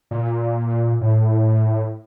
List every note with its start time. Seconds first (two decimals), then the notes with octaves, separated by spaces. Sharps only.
0.11 A#2
1.01 A2